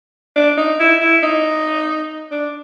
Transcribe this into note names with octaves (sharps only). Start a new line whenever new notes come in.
D4
D#4
E4
E4
D#4
D4